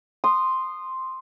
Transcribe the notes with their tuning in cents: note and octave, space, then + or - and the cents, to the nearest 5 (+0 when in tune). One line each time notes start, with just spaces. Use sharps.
C6 +0 D#6 -15